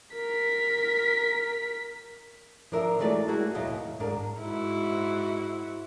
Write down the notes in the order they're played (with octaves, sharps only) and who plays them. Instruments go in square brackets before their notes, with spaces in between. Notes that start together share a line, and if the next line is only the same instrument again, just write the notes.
[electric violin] A#4 B6
[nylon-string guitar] F3 D4 A#4 E5
E3 F#3 G#3 A3 D5 D#5
F#3 G#3 E4 F#4 G#4
D#2 B2 F#3 E4 D#5 F5
D#3
G#2 G#3 D4 G#4 A#4
[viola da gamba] G#2 E4 F#4